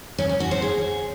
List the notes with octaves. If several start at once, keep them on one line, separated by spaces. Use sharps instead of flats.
C#4
C#4
F#4
C5
G#4